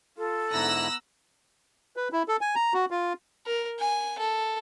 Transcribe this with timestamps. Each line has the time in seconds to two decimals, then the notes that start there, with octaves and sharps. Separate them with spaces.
0.18 F4 A4
0.53 G#2 D3 B3 E4 A#5 E6 F#6 A#6
1.96 B4
2.12 E4
2.28 A4
2.41 G#5
2.55 A#5
2.74 F#4
2.91 F4
3.46 A#4
3.79 G#5
4.18 A4